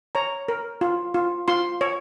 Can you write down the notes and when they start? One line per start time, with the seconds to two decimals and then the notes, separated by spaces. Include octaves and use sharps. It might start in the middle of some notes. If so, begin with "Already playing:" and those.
0.15 C#5 A#5
0.48 A#4
0.81 F4
1.14 F4
1.48 F4 C6
1.81 C#5